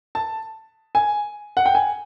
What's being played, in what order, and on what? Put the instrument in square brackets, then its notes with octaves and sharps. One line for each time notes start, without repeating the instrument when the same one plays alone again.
[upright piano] A5
G#5
F#5
G5
G#5